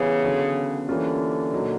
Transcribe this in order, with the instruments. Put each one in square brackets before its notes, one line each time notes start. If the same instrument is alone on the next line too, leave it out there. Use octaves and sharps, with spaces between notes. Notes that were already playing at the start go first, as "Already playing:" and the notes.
Already playing: [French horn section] C#3 [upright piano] E3 G3 B3
[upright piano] D3 F#3 B3
[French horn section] D3 [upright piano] E3 G3 A#3 C#4 F4
[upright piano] A#2 F#3 A#3 D#4